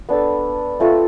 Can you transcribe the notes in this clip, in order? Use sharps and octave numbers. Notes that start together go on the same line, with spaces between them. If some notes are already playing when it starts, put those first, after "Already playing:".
B3 D4 A4
A3 C4 F4 A4